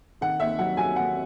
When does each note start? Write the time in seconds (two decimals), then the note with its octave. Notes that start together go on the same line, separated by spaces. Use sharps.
0.21 D#3 F#5
0.40 D#2 E5
0.59 F#3 F#5
0.77 F#3 G#5
0.96 D#2 F#5